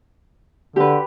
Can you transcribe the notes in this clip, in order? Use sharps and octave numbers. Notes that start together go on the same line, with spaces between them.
D3 G4 B4